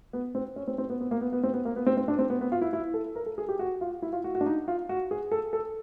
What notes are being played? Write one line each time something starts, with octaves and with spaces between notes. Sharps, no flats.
B3
C4
C#4
C4
C4
B3
B3
A#3
B3
B3
C4
B3
A#3
B3
C4
C4
D4
C4
B3
B3
F4
E4
E4
A4
A#4
A4
G#4
G4
F#4
F4
E4
F4
F#4
F#4
D4
D#4
F4
F#4
G#4
A4
A4